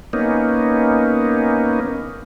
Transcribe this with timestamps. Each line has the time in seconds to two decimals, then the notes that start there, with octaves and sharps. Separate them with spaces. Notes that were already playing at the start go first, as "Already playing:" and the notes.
0.13 A#3 B3 C#4 D#4